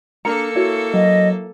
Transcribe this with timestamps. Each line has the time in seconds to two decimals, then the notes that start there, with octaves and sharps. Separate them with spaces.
0.25 A#3 D4 A4 A#4 A#5 C#7
0.55 E4 F#4 C#5
0.94 F#3 D#5